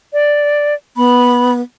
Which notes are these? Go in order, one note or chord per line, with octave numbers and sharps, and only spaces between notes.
D5
B3 B5